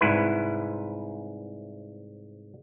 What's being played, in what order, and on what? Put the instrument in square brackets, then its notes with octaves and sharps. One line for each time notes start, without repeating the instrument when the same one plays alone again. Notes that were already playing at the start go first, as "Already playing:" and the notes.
[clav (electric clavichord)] C2 G#2 E4 B4